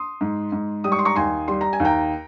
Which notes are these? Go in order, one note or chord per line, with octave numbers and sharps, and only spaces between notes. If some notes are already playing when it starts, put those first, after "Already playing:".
Already playing: C6 D#6
G#2
G#2
G3 D#6
C#6
C6
A#5 C#6
D#2 G#5 C6
G3 C6
A#5
G#5
D#2
G5 A#5